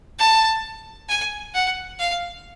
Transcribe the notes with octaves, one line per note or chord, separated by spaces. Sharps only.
A5
G#5
F#5
F5